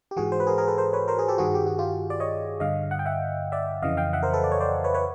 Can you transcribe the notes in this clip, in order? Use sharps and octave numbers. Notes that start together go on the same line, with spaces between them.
G4
G#2 E3 F#4 G#4
C5
B4
G#4 A#4
G#4 A#4
A4 B4
A#4 C5
B4 C#5
A#4 C5
G#4 A#4
G4 A4
G2 D#3 F#4 G#4
G4
F#4
F4 G4
D5
C#5 D#5
G2 D3 D#5 F5
F#5
G5
E5 F#5
D5 E5
F2 C#3 E3 D#5 F5
F5 G5
E5 F#5
A#4 C5
A4 B4
D5
C#5
C5 D5
B4 C#5
B4 C#5